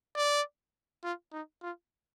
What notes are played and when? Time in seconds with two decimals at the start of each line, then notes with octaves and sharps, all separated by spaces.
0.15 D5
1.04 F4
1.33 D#4
1.62 F4